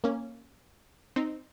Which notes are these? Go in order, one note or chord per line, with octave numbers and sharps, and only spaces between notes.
A#3 C#4
C4 D#4